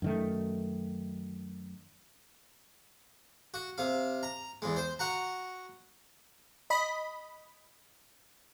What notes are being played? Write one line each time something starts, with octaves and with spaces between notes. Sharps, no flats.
F#2 D#3 A3
F#4
C3 F5
A#5
E2 G#3
C5
F#4 F#5 A#5
D#5 B5